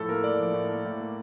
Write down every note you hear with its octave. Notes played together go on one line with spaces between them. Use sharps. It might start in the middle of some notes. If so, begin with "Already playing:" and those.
Already playing: A2 F3 A4
A#3 A#4
A2 D5
F3
A2
A#3
A2
A#3